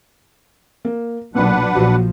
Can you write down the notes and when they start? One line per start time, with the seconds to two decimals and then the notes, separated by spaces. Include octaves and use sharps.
0.85 A#3
1.35 B1 A#2 F#3 D4 B4 F#5
1.75 A#1 F3 F#3 F#4